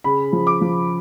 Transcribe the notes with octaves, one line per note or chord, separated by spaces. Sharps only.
C#3 B5
F3
D6
F3